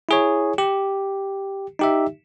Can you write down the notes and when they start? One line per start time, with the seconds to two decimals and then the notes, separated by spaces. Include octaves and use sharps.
0.09 E4 G#4 C#5
0.58 G4
1.79 D#4 G4 E5